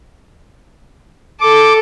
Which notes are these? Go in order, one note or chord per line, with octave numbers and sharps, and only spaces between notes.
A4 D6